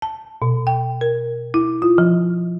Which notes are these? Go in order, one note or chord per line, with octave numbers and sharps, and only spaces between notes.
A5
B2
G5
A#4
E4
F4
F3